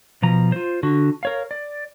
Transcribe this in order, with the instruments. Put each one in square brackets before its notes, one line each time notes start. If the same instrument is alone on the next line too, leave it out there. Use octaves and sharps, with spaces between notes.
[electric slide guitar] B2 F3 A#5
F4 C5
D3 F#4
A#4 C#5 F5
D5